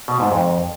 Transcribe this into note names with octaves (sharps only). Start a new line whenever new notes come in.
B2
G#2
F2